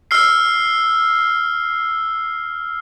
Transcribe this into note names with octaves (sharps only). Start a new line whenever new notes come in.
E6 F6 C7